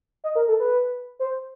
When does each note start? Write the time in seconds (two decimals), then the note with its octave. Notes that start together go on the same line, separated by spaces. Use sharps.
0.24 D#5
0.35 A#4
0.48 A4
0.60 B4
1.19 C5